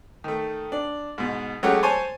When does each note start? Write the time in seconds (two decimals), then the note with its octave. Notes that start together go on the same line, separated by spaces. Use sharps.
0.24 D#3 A3
0.72 D4
1.18 G#2 B2
1.63 F#3 G#3 A3 C#4 G4 F#5
1.83 C5 C#5 G#5 A5